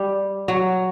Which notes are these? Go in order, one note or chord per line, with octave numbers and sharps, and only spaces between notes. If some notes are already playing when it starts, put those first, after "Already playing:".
Already playing: G3
F#3